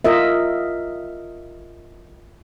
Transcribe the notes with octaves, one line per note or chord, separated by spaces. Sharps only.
F4 A#4 D#5 E5